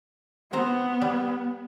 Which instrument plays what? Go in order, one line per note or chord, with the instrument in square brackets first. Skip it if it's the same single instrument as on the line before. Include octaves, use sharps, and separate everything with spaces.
[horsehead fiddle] B3 [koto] C4 C5 A#5
[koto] G3